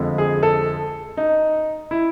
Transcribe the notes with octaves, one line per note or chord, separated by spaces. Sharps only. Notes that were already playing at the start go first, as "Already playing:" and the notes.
Already playing: F2 D3 F3 G#3
G#4
A4
D#4
E4